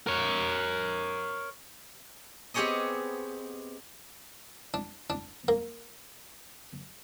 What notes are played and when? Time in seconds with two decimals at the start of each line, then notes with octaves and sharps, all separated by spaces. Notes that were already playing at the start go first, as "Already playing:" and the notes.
0.07 A#4 C#5
2.54 B3 C4 G4 G#4 C#5 D#5
4.74 D4
5.10 D4
5.48 A#3